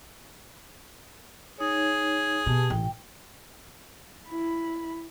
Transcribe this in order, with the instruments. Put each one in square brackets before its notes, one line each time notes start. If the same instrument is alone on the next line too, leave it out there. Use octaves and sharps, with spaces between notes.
[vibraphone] D#4 C#5 [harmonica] G#4
[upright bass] B2 [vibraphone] G4 A5
[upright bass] A1 [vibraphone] G5
[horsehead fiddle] E4 B5